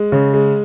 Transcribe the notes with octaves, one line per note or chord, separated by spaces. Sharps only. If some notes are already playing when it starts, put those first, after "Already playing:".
Already playing: G#3
C#3
G#3